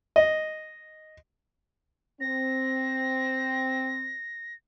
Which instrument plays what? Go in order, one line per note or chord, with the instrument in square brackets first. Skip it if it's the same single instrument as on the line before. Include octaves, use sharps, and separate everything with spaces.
[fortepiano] D#5
[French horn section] C4 [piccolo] A#6